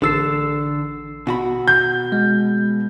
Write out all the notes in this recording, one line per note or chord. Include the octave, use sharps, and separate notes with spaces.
A1 D3 A4 E6 C7
B2 F#4 B5
G6
G#3